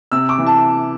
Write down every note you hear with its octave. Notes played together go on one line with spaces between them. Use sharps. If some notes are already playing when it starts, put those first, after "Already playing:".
C3 E6
D6
E3
A5